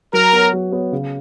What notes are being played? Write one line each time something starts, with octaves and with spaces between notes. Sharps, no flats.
F#3 A#4
B3 F#4 C#5
F#3
B3 F#4 C#5
C#3